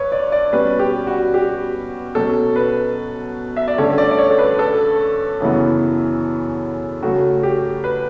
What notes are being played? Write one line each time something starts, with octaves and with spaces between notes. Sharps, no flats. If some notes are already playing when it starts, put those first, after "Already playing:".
Already playing: G2 B4 C#5
D5
D5
B2 G3 C#4 B4
G4
F#4
G4
B2 F#3 C#4 A4
B4
E5
D5
G2 D3 A3 C#4 C#5
D5
D5
C#5
A4
B4
A4
F#2 C#3 E3 B3
C#3 F#3 A3 F#4
G4
B4